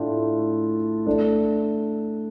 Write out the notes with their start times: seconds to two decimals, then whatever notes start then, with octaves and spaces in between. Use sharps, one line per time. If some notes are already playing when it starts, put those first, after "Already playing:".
Already playing: A2 A3 D4 F4
1.06 A3 D4 A4